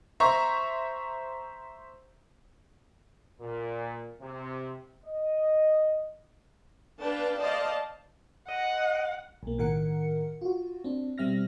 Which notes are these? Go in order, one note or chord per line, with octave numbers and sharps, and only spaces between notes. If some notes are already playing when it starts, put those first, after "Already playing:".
C5 E5 A#5 C#6
A#2
C3
D#5
D4 B4 F5 G5 A5
C5 D5 D#5 F5 A5
D#5 F#5
B1 A#3
A2 D#3 A#4 F#5 C#7
F4 F#4
C4 D4
B2 G3 C4 E5 F6 A#6